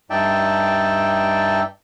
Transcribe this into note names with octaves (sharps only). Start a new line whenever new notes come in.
G2 D#4 D5 E5 G5 A5